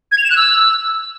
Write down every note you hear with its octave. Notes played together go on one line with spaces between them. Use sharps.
G#6
F7
E7
F#6
E6